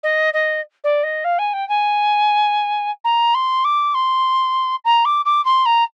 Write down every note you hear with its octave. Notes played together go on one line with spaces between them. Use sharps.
D#5
D#5
D5
D#5
F5
G#5
G5
G#5
A#5
C6
D6
C6
A#5
D6
D6
C6
A#5